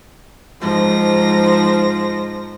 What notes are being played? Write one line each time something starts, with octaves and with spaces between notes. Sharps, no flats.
G#2 F3 A#6